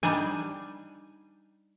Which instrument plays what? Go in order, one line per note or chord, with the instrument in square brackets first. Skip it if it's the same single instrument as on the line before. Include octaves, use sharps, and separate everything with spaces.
[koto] G3 D4 D#4 G#5